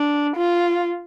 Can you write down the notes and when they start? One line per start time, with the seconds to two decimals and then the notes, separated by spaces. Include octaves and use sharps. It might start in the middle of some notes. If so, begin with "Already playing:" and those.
Already playing: D4
0.36 F4